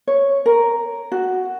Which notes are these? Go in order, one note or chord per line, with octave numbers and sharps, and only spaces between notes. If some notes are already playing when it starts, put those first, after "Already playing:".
C#5
A#4
F#4